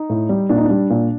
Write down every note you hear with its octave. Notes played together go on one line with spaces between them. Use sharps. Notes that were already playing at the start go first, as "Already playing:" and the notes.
Already playing: D#4
A2
G3
A#2 D4
D#4
D4
G3
A#2